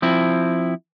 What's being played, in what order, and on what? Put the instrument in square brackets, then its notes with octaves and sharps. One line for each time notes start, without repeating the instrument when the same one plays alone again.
[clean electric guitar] F3 C4 E4